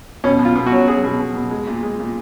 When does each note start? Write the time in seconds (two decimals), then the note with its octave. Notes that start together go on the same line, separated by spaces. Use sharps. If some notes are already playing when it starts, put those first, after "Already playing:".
0.24 B2 C#4
0.39 B2
0.45 F4
0.56 B2
0.66 F#4
0.72 F#3
0.88 F#3 G#4
1.04 B2
1.20 B2
1.35 B2
1.51 G#3
1.67 A#2
1.83 G#3
2.00 A#2